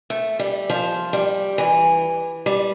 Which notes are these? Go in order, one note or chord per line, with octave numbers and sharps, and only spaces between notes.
A3
G3
F3
G3
E3
G3